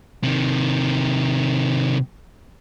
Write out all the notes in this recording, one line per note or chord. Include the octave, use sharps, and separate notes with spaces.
C3 D#3